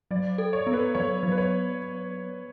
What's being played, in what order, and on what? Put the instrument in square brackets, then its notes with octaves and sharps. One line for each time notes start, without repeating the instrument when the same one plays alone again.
[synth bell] F#3 [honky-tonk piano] D5
[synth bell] A4
[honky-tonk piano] C#5
[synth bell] B3
[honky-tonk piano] B4
[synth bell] F#3 [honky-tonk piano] C#5
[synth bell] F#3
[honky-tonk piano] B4
C#5